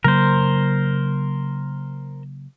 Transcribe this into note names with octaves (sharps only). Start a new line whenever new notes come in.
C#3 F#3 A#3 A#4 C5